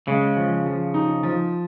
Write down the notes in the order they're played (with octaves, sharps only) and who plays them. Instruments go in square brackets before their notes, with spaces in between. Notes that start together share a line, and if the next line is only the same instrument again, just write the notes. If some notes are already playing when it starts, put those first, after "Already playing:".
[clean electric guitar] C#3 [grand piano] G#3
[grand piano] F3
F3
D#4
F3